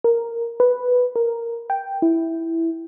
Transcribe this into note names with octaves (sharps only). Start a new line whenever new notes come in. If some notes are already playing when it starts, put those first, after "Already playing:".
A#4
B4
A#4
G5
E4